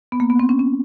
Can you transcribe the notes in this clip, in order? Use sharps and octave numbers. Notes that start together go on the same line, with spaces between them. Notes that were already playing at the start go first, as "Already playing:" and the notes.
B3
A#3
B3
C4
C#4
C#4